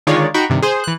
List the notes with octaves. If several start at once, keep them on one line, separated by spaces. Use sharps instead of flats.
D3 D#3 G#3 F4 C#5 D5
D#4 F#4 G5 B5 C#6
G2 C3 D#3
G#4 C5
E3 F#6